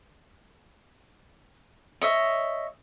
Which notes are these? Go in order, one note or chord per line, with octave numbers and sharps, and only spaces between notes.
C#5 D#5 E5